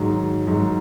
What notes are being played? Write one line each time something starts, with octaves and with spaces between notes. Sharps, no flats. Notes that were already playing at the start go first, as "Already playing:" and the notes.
Already playing: G#2 D#3 F#3
G#2 D#3 F#3